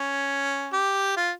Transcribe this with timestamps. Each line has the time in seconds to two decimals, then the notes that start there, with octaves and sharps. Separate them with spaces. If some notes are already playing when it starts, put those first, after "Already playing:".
Already playing: C#4
0.73 G4
1.16 F4